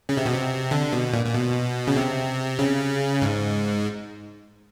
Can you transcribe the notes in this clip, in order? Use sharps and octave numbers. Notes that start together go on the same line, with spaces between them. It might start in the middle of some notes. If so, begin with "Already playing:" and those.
C#3
C3
B2
C3
D3
B2
A#2
A#2
B2
C#3
C3
C#3
G#2